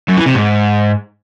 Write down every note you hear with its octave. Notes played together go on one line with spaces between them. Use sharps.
F#2
E3
C3
G#2